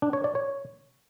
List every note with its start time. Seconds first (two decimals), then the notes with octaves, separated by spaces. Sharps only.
0.02 D4
0.13 C#5
0.24 D5
0.35 C#5